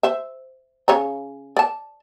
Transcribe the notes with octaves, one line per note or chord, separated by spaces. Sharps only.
C5 E5
C#3 C#5 A#5
D5 A5